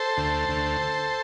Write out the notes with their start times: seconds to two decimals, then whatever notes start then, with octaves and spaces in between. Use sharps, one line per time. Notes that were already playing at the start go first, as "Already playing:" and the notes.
Already playing: A4 C5
0.17 D2
0.49 D2